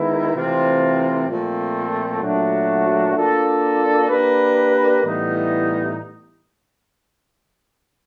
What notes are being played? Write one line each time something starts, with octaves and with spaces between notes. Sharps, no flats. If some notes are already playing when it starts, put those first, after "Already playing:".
Already playing: D#3 G#3 B3 E4
C3 E3 A3 C4 F4
A#2 F3 A3 C4
A#2 F#3 A3 D4 F#4
A#3 D4 F4 A4
A#3 D4 G4 B4
A2 E3 G3 B3 D#4